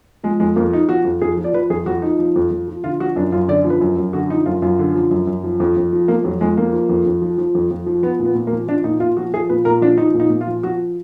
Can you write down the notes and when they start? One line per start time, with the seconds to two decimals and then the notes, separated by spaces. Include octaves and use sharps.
0.23 F3 G#3
0.40 F2 G#3
0.56 F2 A#3
0.73 F3 D#4
0.89 F3 F#4
1.05 F2
1.22 F2 G#4
1.37 F3
1.44 D5
1.53 F3 B4
1.70 F2 G#4
1.86 F2 F#4
2.02 F3 D#4
2.19 F3
2.36 F2
2.51 F2
2.68 F3
2.84 D3 F4
3.00 F3 F#4
3.16 F#2 D4
3.32 F#2 F4
3.48 D3 D5
3.64 F3
3.70 B4
3.81 F#2
3.97 F#2
4.13 D3 F#4
4.30 F3 D#4
4.46 F#2 F4
4.62 F#2 F4
4.79 D3
4.95 F3
5.11 F#2
5.27 F#2
5.44 F3
5.60 F2
5.77 F2
5.93 F3
6.08 F3 A#3
6.24 F2 F#3
6.41 F2 G#3
6.57 F3 A#3
6.73 F3
6.89 F2
7.06 F2
7.22 F3
7.38 F3
7.55 F2
7.71 F2
7.86 F3
8.03 F3 B3
8.20 A#2
8.25 B3
8.35 A#2
8.47 A#3
8.52 F3
8.68 F3 D4
8.84 A#2 D#4
9.00 A#2 F4
9.17 F3 F#4
9.34 F3 G#4
9.50 A#2 B4
9.65 A#2 A#4
9.81 F3 D4
9.98 F3 D#4
10.14 A#2
10.20 D#4
10.30 A#2
10.41 F4
10.47 F3
10.63 F3 F#4